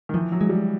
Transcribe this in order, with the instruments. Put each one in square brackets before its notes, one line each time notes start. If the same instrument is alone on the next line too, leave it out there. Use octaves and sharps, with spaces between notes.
[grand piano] D#3
[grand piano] E3 [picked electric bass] F3
[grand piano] F#3
[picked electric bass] G#3
[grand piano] G3